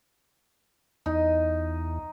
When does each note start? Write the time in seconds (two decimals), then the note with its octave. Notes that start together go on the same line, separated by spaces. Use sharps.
1.06 E2 D#4